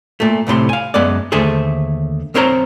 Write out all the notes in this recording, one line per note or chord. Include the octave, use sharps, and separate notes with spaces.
A#2 A3
C2 A2 C3 C6
F5 G#5
F#2 G#3 B3 D5
D#2 D3 A3 G#4 C5
B1 C4 A#4 C5 C#5 A#5